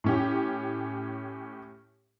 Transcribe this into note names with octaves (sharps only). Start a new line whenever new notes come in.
A2 C#4 G4